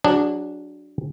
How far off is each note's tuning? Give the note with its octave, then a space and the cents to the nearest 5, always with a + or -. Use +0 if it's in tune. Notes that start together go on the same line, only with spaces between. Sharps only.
F#3 +0 D4 +0 G#4 -25